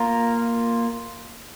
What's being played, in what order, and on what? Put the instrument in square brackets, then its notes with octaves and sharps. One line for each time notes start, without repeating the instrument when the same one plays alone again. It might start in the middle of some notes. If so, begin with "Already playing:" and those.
Already playing: [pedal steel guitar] A#3 F4 A#4